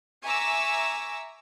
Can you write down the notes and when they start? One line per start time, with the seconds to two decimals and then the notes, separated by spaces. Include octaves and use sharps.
0.23 E5 G#5 A#5 C#6 D6 E6